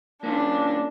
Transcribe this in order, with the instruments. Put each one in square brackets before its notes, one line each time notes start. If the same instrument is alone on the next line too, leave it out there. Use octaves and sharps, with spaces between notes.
[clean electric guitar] A#3 C#4 F4 [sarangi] D4